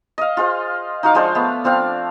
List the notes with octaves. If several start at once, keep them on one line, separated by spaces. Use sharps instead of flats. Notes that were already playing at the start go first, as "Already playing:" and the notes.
D#5 F5
F4 G#4 C5
D#4 F#4 F5 D6
F3 G#3 D4 C5
A3 B3
F3 C4 D4 F5